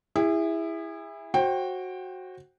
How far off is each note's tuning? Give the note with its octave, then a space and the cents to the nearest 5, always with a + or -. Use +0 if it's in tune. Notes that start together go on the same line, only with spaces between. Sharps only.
E4 +0 G#4 -35
F#4 +0 C5 +30 G5 +0